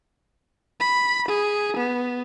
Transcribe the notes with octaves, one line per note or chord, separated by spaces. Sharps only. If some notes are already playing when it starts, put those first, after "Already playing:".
B5
G#4
B3